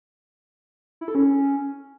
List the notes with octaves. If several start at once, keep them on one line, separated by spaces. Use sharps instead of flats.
E4
A4
C#4